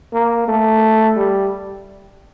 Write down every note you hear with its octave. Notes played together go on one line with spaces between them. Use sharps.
A#3
A3
G3